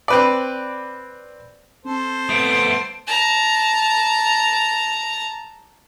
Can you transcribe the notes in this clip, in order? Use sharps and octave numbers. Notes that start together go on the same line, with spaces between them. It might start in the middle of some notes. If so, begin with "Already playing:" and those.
C4 B4 D5
C4 A4 C5
A3 B3 D7
A5 A#5